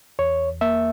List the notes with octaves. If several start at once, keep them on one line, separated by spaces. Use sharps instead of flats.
E2 C#5
A#3 E5